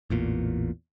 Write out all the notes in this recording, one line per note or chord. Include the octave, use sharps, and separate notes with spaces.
A1 E2 A#2